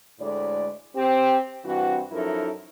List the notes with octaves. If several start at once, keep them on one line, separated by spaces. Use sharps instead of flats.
D2 A2 G#3 D5
C4 G4
G2 E3 C4 F#4
F#2 F3 D#4 E4 A4 A#4